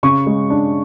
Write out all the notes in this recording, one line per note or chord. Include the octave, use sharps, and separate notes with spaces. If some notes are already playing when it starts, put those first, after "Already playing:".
C#3 C#6
G#3
D4